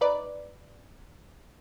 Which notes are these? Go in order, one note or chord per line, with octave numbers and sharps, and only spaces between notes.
D#4 B4 D5